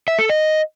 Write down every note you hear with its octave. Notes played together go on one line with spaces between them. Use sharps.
E5
A4
D#5